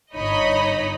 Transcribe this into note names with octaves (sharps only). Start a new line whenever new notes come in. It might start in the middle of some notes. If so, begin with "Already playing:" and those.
G1 D#4 C#5 D#5 B5